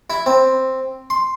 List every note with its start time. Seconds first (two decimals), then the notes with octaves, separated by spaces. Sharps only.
0.10 E4
0.26 C4
1.10 C6